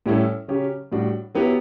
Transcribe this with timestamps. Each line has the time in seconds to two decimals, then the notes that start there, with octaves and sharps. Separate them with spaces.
0.06 A2 G3 C#4 E4 A4
0.48 C#3 F#3 C#4 G4
0.92 A2 G3 D4 F#4
1.35 F#3 B3 E4 G4